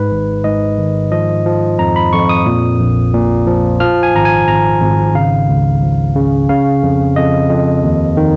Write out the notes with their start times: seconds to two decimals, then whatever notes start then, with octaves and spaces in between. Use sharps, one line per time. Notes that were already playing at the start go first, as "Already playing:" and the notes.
Already playing: G#2 B4
0.11 G#1
0.44 G#2 D#5
0.78 D#3
1.11 F3 D#5
1.46 F3
1.79 F2 A#5
1.96 B5
2.13 F2 C#6
2.29 D#6
2.46 A#2
2.79 A#1
3.14 A#2
3.47 F3
3.80 F3 F6
4.03 G#5
4.14 G#1 A#5
4.25 G#5
4.48 G#1 A#5
4.81 G#1
5.15 C#3 F5
5.48 C#2
5.82 F3
6.16 C#3
6.49 C#3 F5
6.83 F2
7.16 F2 D#5
7.50 F2
7.84 D#2
8.17 D#3